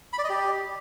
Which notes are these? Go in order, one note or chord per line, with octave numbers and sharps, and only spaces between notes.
B5
D5
D#5
G4